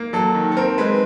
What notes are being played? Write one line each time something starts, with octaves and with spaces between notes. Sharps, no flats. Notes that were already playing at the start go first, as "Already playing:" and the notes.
Already playing: A#3
F#3 A4
D#3
A4
C4 A#4
G#3 B4